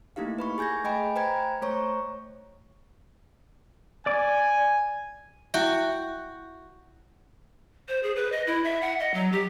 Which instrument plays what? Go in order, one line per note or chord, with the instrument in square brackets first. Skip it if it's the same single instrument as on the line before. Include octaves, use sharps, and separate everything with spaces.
[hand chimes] A3 A#3 D#4 E4 G4 F5
B4 B5 C#6
G#4 G#5 G6 G#6 A#6
A3 D#5 G5 G#5 B5 D7
B4 C5 G5 A#5 B5 G#6
A3 C5 C#5 A#5 C#6
[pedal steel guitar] D5 D6 [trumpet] G#5
[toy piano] E4 E5 [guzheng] F#4 G5
[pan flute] C5
G#4
B4
D#5
E4
E5
F#5
D#5
F#3
G4